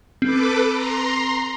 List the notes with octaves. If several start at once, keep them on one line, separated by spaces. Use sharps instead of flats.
C4 A4 B4 D6
A#5 C6